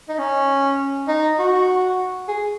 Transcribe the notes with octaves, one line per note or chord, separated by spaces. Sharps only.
D#4
C#4
D#4
F#4
G#4